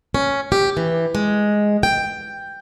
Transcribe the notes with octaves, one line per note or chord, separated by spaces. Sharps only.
C#4
G4
E3
G#3
G5